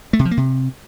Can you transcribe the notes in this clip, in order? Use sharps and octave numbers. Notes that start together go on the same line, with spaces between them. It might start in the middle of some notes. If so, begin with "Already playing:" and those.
A3
C3
F3
A#3
C3